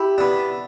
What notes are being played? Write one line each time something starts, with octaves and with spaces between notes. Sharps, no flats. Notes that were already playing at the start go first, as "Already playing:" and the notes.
Already playing: E4 G4
B3 D4